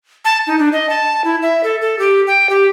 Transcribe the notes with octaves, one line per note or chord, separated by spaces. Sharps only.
A5
D#4
D4
D#5
A5
E4
E5
A4
A4
G4
G5
G4